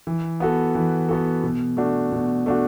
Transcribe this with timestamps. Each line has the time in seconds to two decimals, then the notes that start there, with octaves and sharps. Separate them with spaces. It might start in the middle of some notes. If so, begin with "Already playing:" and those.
0.07 E3
0.40 B3 F#4 A4
0.75 E3
1.09 B3 F#4 A4
1.44 B2
1.77 A3 D4 F#4
2.12 B2
2.46 A3 D4 F#4